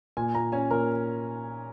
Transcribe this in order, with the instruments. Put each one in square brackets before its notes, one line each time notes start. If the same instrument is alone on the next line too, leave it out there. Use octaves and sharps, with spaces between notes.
[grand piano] A#2 G#5
A#2 A#5
C#4 G#5
A#2 A#4